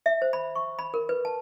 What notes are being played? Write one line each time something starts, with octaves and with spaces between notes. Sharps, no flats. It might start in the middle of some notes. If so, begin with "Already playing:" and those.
E5
C5
B5
C#6
B5
A#4
B4
A5